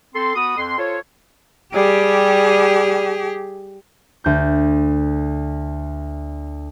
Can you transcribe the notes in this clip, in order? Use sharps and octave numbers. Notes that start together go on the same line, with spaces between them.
C4 A4 C6
B3 F#4 B5 D#6
F2 C6
F4 A4 C5 C#5
G3 G4 G#4
D2 G6